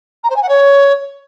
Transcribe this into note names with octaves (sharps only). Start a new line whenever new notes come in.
A#5
C5
G#5
F#5
C#5